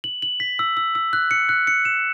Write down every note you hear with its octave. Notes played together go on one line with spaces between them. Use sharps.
F#7
F#7
B6
E6
E6
E6
F#6
C#7
F#6
C#7
E7